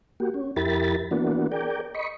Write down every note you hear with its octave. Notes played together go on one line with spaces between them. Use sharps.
A#3 F#4 G4
C#4
F2 E4 G4 A#4 B5 A6
E3 A#3 B3 D4 F#4
G#4 A#4 D5 G5
D#5 B5 C#6